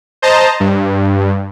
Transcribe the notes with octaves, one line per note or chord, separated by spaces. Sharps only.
C5 D#5 A5 A#5
G2